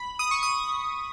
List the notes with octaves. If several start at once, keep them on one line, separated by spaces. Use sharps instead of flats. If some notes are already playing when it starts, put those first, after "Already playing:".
Already playing: B5
D#6
C#6
D#6